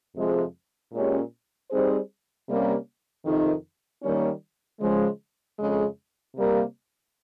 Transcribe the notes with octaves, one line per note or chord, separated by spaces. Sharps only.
F2 C3 F3 G#3
A#2 G#3 C#4 G4
G3 C4 D#4 G#4 C5
C3 G3 A#3 C#4
F2 C3 D#3
D#3 G3 A#3 C#4
C#3 F3 G#3
F2 C#3 G#3
C3 G3 A#3